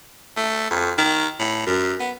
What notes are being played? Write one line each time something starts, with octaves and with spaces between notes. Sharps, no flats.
A3
F2
D#3
A2
F#2
B3